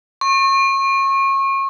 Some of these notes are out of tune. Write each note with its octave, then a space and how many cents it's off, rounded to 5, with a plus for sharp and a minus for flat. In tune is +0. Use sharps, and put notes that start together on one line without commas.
C#6 -30